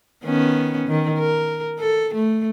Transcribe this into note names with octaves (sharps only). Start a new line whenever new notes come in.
D#3 B3 C#4
D#3
A#4
A4
A3